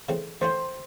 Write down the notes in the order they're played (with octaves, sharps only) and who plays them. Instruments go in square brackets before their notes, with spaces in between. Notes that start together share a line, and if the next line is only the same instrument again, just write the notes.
[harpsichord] C#3 E3 A3 C4
[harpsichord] E3 A3 C#4 E4 [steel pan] C5